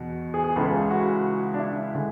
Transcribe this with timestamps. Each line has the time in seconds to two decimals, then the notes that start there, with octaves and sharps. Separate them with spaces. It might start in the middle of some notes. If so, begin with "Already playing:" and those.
Already playing: E2 B2
0.34 G#4
0.44 G#4
0.56 C#2 C#3 E3 G#3 A4
0.91 F#4
1.54 D4
1.58 E4
1.95 D3 G#3